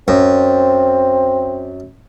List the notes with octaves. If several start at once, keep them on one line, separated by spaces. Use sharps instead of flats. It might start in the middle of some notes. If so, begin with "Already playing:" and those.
F#2 C4